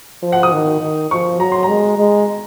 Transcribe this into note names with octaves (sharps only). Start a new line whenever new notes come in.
F3
F#5
D#6
D#3
D#3
F3 C#6
F#3 A#5
C6
A#5
G#3
G#3